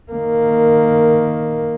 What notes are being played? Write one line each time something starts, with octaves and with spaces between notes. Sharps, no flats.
D#3 A#3